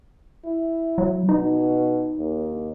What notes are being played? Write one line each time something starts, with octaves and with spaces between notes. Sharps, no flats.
E4
F#3
B2 D#4
D#2